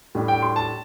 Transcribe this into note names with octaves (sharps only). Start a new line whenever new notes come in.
A2 G3 D4
G5
C6
A5